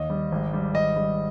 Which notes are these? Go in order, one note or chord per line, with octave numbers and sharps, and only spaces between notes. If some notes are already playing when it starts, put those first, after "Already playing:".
Already playing: D#2 D#5
G3
G#1
G3
G#1 D#5
G3